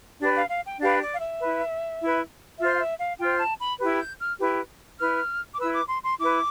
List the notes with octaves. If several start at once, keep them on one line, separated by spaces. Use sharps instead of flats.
D4 G4 B4 D5
F5
F5
G5
D4 G4 B4 F5
D5
F5
E5
E4 B4
E4 B4
F4 C5 E5
F5
E5
F5
F4 C5 G5
A5
B5
E4 G4 B4
G6
F6
E4 G4 B4
E4 B4 F6
D6
E4 B4 E6
D6
C6
C6
E4 B4 D6